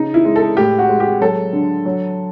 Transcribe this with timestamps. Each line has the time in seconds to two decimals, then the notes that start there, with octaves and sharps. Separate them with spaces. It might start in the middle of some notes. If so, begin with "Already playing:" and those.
Already playing: C#3 D#4
0.14 E4
0.25 G#3
0.36 A4
0.57 A2 G4
0.78 F#4
0.89 G#3
1.00 G4
1.21 F#3 A4
1.53 D3
1.85 F#3